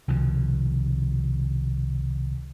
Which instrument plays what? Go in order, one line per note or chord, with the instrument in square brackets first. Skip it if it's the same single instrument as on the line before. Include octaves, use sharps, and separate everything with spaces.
[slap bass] C2 B2 D#3 F3